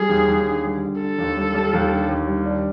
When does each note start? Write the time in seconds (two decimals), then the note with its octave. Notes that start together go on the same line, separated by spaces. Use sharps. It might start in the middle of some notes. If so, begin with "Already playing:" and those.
Already playing: G3 G#4
0.09 D#2
0.28 D#2
0.46 D3
0.64 G3
0.82 D3
1.00 D3 A4
1.18 D#2
1.37 G3
1.54 G3
1.73 D#2
1.91 D3
2.09 D#2
2.27 G3
2.46 D4